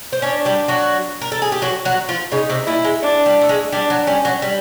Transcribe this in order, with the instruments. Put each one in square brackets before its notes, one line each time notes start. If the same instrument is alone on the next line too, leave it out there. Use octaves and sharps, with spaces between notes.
[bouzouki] C5
[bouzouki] C#4 C#5 [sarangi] D4
[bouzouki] G3 G4
F#3 F#4
A#4
A4
G#4
G4
F#3 F#4
F#3 F#4
F3 F4
[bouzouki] C#3 C#4 [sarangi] D#4
[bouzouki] C3 C4
[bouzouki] A#2 A#3 [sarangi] E4
[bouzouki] G#3
[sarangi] D4
[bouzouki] G3
A3
G#3
[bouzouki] G3 [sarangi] D4
[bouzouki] F#3
[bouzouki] G3 [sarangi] C#4
[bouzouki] F#3
G3